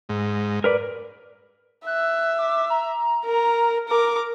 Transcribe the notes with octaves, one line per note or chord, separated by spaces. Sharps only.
G#2
A#4 B4 D5
E5 F#6
D6
A#5
A#4
A#4 D6